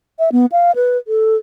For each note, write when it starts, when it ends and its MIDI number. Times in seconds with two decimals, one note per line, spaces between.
0.19 0.30 76
0.32 0.46 59
0.52 0.72 77
0.76 0.97 71
1.08 1.36 69